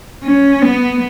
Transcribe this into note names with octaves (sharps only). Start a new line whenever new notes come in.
C#4
B3